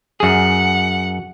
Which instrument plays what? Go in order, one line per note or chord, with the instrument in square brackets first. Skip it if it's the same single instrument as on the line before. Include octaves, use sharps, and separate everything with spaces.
[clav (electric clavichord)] F#2 G#4 [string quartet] F#5